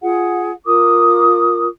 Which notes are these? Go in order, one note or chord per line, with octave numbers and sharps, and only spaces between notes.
F4 G#4 F#5
F4 A#4 D6 D#6